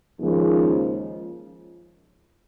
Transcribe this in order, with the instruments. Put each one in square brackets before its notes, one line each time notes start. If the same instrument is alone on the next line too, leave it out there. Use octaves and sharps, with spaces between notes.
[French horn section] D#2 C#3 F3 G#3